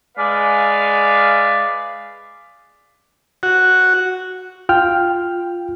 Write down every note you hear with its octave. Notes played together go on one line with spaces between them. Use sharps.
G#3 B4 D5 F5
F#4
F4 G5 F6